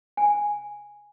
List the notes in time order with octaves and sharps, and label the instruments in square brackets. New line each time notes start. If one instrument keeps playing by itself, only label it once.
[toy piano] G#5